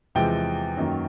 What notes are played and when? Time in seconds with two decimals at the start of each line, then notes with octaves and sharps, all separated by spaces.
0.15 E2 C3 F3 G#3 G5
0.77 F#2 D#3 F#3 A#3